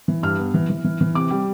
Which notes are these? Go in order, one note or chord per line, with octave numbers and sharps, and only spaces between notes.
E3
G2 F6
B3
E3
E3
E3
E3
C3 D6
G3